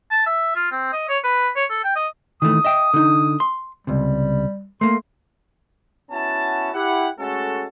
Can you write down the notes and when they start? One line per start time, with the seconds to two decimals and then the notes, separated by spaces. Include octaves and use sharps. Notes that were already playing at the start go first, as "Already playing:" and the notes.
0.11 A5
0.26 E5
0.56 F4
0.72 C4
0.93 D#5
1.09 C#5
1.24 B4
1.56 C#5
1.70 A4
1.84 G5
1.96 D#5
2.42 D#3 E3 A3 D#6
2.65 D#5 E5 G5
2.94 D3 D#4
3.40 C6
3.87 C#2 C3 G3
4.81 A3 A#3 C6
6.11 B3 C#4 E4 F#4 A5
6.74 E4 G4 F#5
7.19 G#3 A3 C#4 F#4 A4